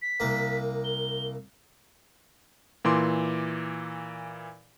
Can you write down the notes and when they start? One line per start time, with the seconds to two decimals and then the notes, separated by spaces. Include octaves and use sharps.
0.02 B6
0.20 C2 A#3
0.84 G7
2.85 A#2 E3 C6 D6